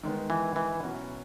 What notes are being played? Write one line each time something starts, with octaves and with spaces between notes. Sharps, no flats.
D#3 G#3 B3
E3
E3
B2 F#3 C#4 F#4